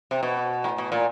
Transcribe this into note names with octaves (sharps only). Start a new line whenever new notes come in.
C3
B2
A2
B2
A#2